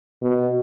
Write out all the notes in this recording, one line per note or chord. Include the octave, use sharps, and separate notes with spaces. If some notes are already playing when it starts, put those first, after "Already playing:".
B2